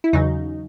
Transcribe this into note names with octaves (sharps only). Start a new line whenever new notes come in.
E4
E2 C#3 F#3 D#4